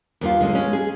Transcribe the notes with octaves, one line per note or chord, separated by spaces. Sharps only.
D#2 A#3 F4
D3 G#3 C#4
G#3 C#4
G#4